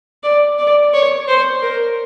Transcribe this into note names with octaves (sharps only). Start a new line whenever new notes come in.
D5
D5
C#5
C5
A#4